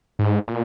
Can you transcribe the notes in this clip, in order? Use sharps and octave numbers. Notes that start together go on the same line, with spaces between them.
G#2
A#2